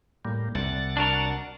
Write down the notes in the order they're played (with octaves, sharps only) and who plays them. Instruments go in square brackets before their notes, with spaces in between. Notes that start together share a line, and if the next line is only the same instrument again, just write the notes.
[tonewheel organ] A2 G3 A#3
[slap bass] C2 [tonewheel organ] D5 F#5 A6
[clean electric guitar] D4 F#4 A#4